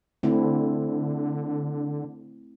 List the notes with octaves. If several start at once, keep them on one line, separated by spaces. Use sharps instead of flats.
D3 A3 C4 E4